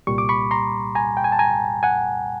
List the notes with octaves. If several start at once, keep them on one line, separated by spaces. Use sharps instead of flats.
C2 A#2 G3 C#6
D6
B5 C#6
A#5 C6
G#5 A#5
G5
G#5
A5
G#5 A#5
F#5 G#5